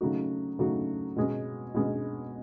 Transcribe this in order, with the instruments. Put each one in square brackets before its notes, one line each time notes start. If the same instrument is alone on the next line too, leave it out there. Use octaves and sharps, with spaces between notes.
[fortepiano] C#3 F#3 A3 D#4 F#4
C#3 F#3 A3 D#4 F#4
B2 G#3 C#4
B2 G#3 C#4